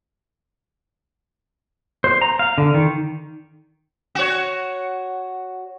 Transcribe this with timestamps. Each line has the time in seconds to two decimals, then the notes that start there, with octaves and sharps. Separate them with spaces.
2.04 C5
2.21 A#5
2.39 F5
2.58 D3
2.74 D#3
4.15 F#4 C#5